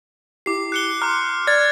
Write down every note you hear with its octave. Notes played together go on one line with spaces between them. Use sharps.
E4 G4 D6 C7
F#6 C#7 G7
A#5 C6 D6 F6 G6
D5 F6 G#6 A6